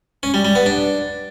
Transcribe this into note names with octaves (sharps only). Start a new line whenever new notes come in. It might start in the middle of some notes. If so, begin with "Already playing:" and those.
C#4
G3
G3
B3
D4